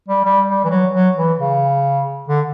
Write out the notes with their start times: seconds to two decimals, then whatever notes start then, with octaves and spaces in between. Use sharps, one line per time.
0.08 G3
0.25 G3
0.48 G3
0.64 E3
0.70 F#3
0.94 F#3
1.16 E3
1.38 C#3
2.29 D3